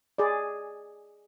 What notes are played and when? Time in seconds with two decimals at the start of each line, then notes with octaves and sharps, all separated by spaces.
0.18 G#4 D5